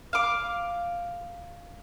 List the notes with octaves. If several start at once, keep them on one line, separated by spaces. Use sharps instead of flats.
F5 D6